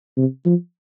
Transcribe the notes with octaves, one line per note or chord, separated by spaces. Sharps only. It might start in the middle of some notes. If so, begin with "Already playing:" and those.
C3
F3